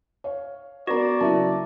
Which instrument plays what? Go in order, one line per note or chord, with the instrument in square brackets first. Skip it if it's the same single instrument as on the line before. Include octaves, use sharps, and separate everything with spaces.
[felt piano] C#5 F5
[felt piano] B3 A#4 B4 [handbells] F#4 [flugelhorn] D5 [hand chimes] A#5 A#6
[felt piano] C#3 F#3 A#3 [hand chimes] E4 E5 A5